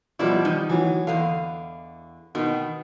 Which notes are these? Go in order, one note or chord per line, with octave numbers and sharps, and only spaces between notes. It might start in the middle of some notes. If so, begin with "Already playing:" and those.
B2 F3 G3 E4 D5
D#3 D#4
E3 F#3
E2 D3 D#5 F5
B2 D#3